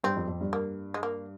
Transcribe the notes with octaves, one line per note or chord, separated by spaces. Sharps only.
G2 C4
F2
F2
G2
A#3
G#3
A#3